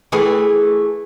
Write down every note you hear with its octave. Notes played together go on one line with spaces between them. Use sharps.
E3 A3 G#4